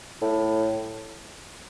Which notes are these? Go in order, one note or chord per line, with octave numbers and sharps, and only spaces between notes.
A2